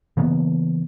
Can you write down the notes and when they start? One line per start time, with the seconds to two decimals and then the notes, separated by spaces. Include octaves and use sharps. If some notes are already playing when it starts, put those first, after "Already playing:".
0.17 C#3 E3 A#3 B3